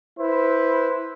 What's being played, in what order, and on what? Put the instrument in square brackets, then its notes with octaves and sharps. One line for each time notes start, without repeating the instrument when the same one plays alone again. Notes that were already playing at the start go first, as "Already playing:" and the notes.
[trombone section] E4 B4 C5